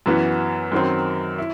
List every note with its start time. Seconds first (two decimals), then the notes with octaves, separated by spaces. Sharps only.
0.06 F#2 E3 B3 F#4
0.72 F#2 D#3 F#3 C4
1.38 E4